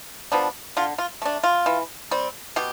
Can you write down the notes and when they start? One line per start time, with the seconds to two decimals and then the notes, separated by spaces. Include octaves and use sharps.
0.32 F3 B3 D4
0.77 D3 F4
0.98 F4
1.22 A3 D4
1.44 F4
1.66 E3
2.11 G3 C4
2.56 B2 G4